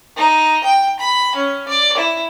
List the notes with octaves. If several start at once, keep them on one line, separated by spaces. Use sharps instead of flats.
D#4
G5
B5
C#4
D5
E4